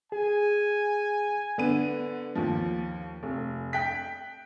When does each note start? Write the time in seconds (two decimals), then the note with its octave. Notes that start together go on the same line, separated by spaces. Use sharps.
0.12 G#4 G#5
1.58 D3 B3 D#7
2.35 D#2 F3
3.23 F1
3.73 G5 F#6 B6